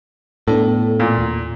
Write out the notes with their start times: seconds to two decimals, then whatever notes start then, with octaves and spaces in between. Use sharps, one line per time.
0.48 A2 B3 D4 A4
1.00 A#2
1.18 D#2 A2